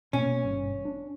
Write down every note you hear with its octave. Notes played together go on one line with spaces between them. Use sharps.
B2 A#3 C#4
G#1 G2
D4